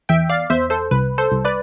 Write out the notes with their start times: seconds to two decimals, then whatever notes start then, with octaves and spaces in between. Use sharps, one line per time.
0.09 E2 E5 G5
0.29 D5 F5
0.50 E2 C5 E5
0.70 A4 C5
0.91 C2 B4
1.18 A4 C5
1.32 C2
1.45 B4 D5